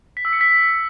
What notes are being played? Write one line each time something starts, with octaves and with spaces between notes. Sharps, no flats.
B6
E6
C#7
B6